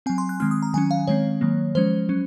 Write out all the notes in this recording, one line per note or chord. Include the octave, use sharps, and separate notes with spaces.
F#3 C4 G#5
C6
F#6
D#3 G#3 C4 F6
D#6
A#5
D#3 F#3 C#4 G#5
F5
D#3 G#3 C4 C#5
D#3 F#3 A#3
F3 G#3 C#4 C5
F#3 C#4